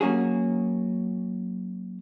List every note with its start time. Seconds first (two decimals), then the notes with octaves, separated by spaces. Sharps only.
0.01 F#3 A#3 C#4 F#4 G#4